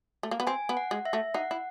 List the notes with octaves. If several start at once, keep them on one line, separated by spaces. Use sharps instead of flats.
A3
A#3
B3
C4 G#5
B3
F#5
G#3
E5
A3
D#4 F#5
E4